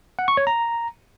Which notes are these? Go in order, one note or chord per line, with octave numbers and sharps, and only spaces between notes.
F#5
C#6
C#5
A#5